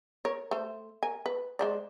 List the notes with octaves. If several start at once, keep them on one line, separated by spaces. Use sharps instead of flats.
A#4 C#5
A3 C5
A#4 G#5
B4
G#3 C5 D5